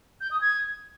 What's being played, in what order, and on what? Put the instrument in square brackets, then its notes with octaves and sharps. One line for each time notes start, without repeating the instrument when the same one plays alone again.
[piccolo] G6
D#6
G#6